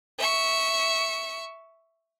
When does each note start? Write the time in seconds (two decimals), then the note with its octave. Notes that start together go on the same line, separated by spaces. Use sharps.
0.18 E5 C#6